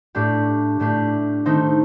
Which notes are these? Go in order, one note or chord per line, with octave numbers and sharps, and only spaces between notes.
A2 A3 D4 G4
A2 A3 D4 G4
D#3 A3 C4 D#4